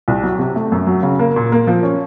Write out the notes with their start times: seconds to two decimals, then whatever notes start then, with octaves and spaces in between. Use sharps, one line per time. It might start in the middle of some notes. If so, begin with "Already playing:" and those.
0.08 C2
0.23 F#3
0.39 C3
0.55 A3
0.72 F#2
0.87 F#3
1.03 C#3
1.19 A#3
1.36 A#2
1.52 A#3
1.67 F3
1.83 C#4